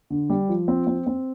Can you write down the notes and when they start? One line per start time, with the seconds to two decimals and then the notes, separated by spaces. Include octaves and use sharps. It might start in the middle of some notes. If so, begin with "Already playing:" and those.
0.10 D3
0.30 G3
0.49 F3
0.68 C4
0.87 C4
1.07 C4